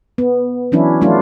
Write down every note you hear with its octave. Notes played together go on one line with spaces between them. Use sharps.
B3
E3 F#3 C#4 D4 E4
F3 F#3 A3 D4 E4 F4